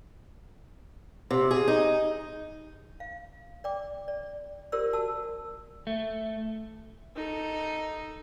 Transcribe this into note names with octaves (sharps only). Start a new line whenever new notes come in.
C3
G#4
D#4
F5
D5 G5 D6
D5
F4 G4 A#4 C5 D5 E6
F#4 A#4 A5 E6
A3
D#4 A4